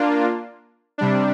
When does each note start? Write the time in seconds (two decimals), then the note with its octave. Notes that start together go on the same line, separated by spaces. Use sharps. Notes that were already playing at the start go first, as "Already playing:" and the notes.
Already playing: A#3 D4 F4
0.98 C3 G3 D4